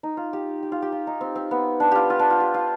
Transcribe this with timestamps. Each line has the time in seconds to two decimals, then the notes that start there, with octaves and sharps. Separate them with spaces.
0.03 D#4
0.17 F4
0.33 G4
0.63 G4
0.72 F4
0.82 G4
0.92 F4
1.07 D#4
1.21 C4
1.36 C4
1.51 B3
1.80 D4
1.91 F4 G4
2.10 F4
2.19 D4
2.30 F4
2.40 G4
2.54 F4